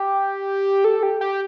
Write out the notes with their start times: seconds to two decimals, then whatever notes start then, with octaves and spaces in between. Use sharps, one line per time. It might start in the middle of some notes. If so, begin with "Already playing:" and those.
Already playing: G4
0.84 A4
1.03 G4
1.21 G4